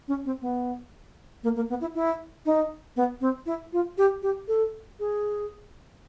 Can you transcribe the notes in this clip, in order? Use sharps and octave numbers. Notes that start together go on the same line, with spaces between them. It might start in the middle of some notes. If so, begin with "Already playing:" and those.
C#4
C4
B3
A#3
A#3
B3
E4
E4
D#4
B3
C4
E4
F4
G4
G4
A4
G#4